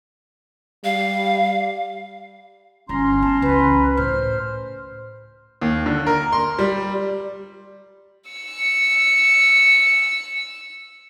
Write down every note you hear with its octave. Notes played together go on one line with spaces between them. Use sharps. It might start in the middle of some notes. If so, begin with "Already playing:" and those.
G3 F5
G1 C#4 A#5 C6
B3 A5
C#2 E3 B4
A2 C5 F6
D#2
D3
A#4
C6
G3
E6 C#7